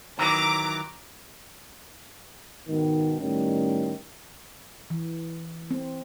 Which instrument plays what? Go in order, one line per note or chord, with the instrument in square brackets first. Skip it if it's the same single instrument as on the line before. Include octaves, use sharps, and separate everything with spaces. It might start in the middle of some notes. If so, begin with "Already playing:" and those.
[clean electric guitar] D#3 E3 F#3 [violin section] A#5 D6
[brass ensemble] G#2 B2 D#3
A2 D#3 G3 C#4
[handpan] E3
C4